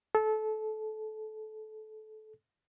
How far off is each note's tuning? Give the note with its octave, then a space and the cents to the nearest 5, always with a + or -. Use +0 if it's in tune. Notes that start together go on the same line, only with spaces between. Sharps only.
A4 -25